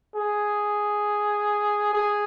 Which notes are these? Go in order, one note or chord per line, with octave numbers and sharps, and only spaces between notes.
G#4
G#4